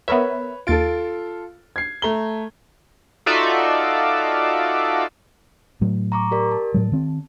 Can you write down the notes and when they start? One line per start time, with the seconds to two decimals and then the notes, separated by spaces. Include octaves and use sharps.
0.08 B3 A#4 B4 C#5 E5
0.67 D#2 F4 A4 A6 D7
1.76 G#6 C7
2.02 A3 A#5 G7
3.26 D#4 F4 F#4 A4 D5 E5
5.81 A2 F#3
6.12 A#5 C#6 D6
6.31 G4 A#4 D5
6.51 A5
6.74 A2 F#3
6.92 D#3 C4